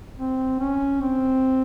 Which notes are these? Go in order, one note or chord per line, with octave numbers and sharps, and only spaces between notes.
C4
C#4
C4